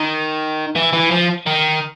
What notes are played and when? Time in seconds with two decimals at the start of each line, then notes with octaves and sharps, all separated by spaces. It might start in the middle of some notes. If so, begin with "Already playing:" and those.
Already playing: D#3
0.75 E3
0.93 E3
1.11 F3
1.46 D#3